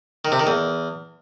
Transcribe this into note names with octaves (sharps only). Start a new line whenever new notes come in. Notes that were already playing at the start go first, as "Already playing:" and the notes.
D#3
C3
D#3
E2